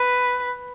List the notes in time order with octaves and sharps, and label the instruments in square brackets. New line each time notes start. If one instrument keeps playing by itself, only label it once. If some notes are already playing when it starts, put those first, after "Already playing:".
Already playing: [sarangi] B4